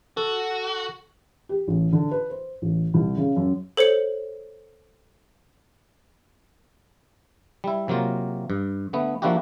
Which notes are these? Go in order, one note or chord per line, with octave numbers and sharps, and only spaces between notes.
F#4 A4
G4
A1
D3
B4
C5
A1
C2
C#3
F#2
A4 C5 C#5 C#7 F#7
G3 E4
C3 F#3 A#3 F4
G2
D3 A3 B3
F3 A#3 D4 E4 F#4 G4